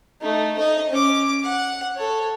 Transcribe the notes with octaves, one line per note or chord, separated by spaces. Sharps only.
A3 D#4
D#4 D#5
C#4 D6
F#5
A4 C#5